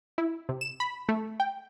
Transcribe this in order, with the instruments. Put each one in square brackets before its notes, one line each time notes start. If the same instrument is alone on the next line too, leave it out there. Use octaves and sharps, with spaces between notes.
[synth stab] E4
C3
E7
B5
A3
G5